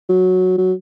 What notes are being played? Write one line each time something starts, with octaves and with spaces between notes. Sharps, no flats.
F#3
F#3